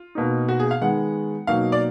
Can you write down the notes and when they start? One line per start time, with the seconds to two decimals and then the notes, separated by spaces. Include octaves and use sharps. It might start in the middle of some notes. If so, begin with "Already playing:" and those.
Already playing: F4
0.15 B2 A#3 D#4
0.49 F#4
0.59 G#4
0.71 F5
0.81 D#3 G#3 B3 F#5
1.47 B2 F#3 A#3 D#4 F5
1.72 D5